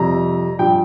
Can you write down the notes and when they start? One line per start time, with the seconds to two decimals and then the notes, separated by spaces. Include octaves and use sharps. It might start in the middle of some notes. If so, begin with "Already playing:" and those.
Already playing: F2 C3 G3 A#5
0.59 G2 F3 G5